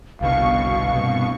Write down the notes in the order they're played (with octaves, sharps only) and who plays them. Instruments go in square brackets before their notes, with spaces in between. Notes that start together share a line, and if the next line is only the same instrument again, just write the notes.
[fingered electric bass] G1 C2 G2 [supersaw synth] B2 C#6 [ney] F5
[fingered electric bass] G2 C3